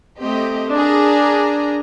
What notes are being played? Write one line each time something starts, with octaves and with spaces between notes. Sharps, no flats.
A3 C4 G4 D#5
D4 G#4 A#4 A#5